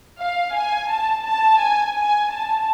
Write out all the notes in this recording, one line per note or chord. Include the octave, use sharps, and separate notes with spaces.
F5
G#5
A5
A5
G#5
G#5
A5